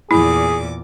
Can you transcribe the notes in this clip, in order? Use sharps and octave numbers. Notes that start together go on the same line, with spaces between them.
E2 A#2 E4 G#4 D6